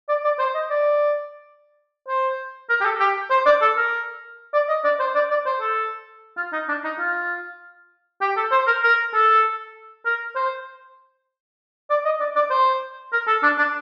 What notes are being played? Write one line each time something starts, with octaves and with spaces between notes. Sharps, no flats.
D5
D5
C5
D#5
D5
C5
A#4
G4
A4
G4
C5
D5
A4
A#4
D5
D#5
D5
C5
D5
D5
C5
A4
F4
D#4
D4
D#4
F4
G4
A4
C5
A#4
A#4
A4
A#4
C5
D5
D#5
D5
D5
C5
A#4
A4
D4
D4